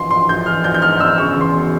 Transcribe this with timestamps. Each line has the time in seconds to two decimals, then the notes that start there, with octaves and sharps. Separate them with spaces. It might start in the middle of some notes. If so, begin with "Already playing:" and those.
Already playing: A#1 E3 C6
0.11 A#1 C6
0.29 A#1 G6
0.46 E3 F6
0.64 A#1 G6
0.74 G6
0.82 G#2 F6
1.00 A#1 E6
1.18 C#3 C#6
1.36 E2 C6
1.53 E1